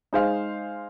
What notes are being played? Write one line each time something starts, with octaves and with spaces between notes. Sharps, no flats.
G#3 D#4 G#4 C5 F5